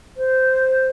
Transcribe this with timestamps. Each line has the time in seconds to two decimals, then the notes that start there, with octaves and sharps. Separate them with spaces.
0.17 C5